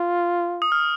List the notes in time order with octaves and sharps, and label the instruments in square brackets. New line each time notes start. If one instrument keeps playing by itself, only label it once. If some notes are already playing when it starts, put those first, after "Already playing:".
Already playing: [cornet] F4
[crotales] D#6
F6